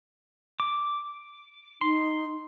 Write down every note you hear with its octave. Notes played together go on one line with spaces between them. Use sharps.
D6
D#4 C6